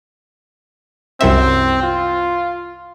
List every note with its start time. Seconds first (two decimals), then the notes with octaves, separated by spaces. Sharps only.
1.21 C2 F#2 C4 E5
1.83 F4